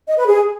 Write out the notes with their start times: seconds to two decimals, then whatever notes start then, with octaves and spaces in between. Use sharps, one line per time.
0.08 D#5
0.17 B4
0.27 G#4